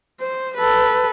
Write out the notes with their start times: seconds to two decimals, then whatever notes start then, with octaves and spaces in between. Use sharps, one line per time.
0.20 C5
0.57 A4 B4